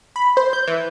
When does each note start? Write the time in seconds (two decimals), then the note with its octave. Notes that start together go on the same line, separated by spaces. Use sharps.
0.16 B5
0.37 C5
0.53 G6
0.67 E3